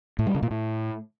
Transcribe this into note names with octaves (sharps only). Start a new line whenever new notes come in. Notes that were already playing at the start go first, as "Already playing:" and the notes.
A2
G3
C#3
A#2
A2